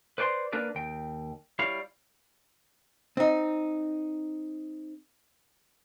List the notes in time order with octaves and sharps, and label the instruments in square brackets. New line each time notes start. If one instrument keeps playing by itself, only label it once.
[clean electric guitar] B4 C5 D5 G#5 C6
A#3 D4 A#4 B4 D5
D#2 G5
G3 E4 C#5 F5
[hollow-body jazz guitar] C4 D#4